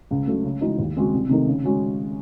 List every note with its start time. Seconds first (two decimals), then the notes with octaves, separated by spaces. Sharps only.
0.11 C#2
0.27 C#3 F#3 A3
0.44 C#3
0.61 E3 G#3 D#4 F#4
0.78 D#2
0.96 C#3 G#3 C4 F#4
1.13 C2
1.29 C3 D#3 A3 D#4
1.47 C#3
1.64 G#3 C#4 F#4